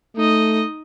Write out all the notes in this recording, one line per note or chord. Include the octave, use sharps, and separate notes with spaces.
A3 D#4 D#5